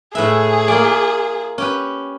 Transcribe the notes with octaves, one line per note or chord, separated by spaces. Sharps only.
A2 G#4 B4 E5
A#3 F4 D5
C#4 G4 B4